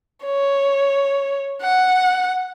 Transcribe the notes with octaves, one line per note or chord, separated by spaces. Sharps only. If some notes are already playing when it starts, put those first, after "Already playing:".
C#5
F#5